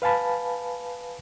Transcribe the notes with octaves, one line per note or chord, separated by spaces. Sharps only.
B4 F5 G#5 A5 B5